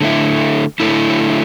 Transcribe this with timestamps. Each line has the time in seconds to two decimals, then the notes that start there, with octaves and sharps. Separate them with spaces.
0.01 D3 A3 E4
0.80 D3 A3 E4